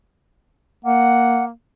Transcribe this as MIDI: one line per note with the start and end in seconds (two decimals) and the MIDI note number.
0.85 1.51 58
0.85 1.44 78